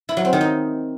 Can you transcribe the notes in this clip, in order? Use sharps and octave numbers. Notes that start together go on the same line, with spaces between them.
E4
F#3
C4
D#3
D#4